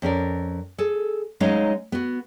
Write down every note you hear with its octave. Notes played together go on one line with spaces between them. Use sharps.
F2 C#4 A#4 D5
G#4 A4
F#3 G#3 C#4 D#4 F5
B3 F#4